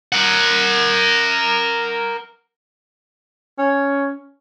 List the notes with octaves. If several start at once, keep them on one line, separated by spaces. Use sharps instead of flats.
A#4 F#5
C#4